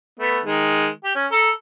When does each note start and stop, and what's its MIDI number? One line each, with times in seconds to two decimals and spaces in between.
0.19 0.40 57
0.19 0.40 59
0.45 0.88 51
0.45 0.88 56
1.04 1.15 67
1.15 1.27 61
1.32 1.50 69
1.32 1.50 82